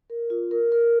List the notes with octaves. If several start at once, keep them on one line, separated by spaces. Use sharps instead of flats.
A#4
F4
A#4
A#4